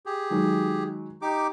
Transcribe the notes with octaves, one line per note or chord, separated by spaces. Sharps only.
G4 G#4
D#3 F#3 G#3
D#4 G4 D6